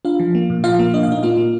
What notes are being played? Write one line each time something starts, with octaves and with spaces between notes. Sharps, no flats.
D4 F4 F5
F3
A#3
A#2
F3 F4 F5
A#3
D4 D#5
F5
A#2 D#4 D#5
A#3 F4 F5
A#3